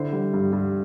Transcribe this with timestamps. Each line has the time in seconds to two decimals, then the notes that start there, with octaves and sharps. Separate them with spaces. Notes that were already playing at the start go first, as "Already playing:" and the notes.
Already playing: D3 E4 C5
0.13 G3
0.34 G2
0.53 G2